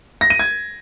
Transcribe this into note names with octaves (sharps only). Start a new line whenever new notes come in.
A#6
D#7
G#6